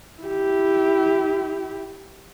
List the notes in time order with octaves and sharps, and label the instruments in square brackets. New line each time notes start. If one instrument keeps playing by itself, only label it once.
[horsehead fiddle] E4 G4